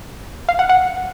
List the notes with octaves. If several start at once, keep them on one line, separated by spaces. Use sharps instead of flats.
F5
F#5
F#5